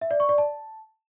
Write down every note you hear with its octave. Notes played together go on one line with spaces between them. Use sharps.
E5
D5
C#6
D5
A5